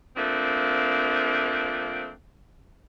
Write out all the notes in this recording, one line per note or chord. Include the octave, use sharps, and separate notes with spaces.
F3 A3 A#3 C4 D4